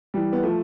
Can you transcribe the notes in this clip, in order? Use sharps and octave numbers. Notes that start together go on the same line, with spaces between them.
E3 G3
B3
F3 A3